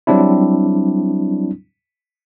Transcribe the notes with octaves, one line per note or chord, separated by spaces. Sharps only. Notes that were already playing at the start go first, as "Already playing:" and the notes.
F#3 G3 C4 D4 E4